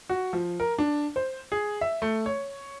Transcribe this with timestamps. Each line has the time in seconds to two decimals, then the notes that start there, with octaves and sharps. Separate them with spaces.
0.10 F#4
0.33 F3
0.60 A#4
0.78 D4
1.16 C5
1.52 G#4
1.81 E5
2.02 A3
2.26 C#5